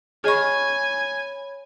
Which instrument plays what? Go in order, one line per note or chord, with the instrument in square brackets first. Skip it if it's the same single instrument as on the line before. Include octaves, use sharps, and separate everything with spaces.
[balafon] G#4 D#5 C#6 [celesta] C#5 B5 [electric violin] G#5